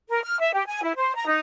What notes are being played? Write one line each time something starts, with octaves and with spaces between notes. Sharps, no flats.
A#4
F6
E5
G4
G#5
E4
C5
A#5
D#4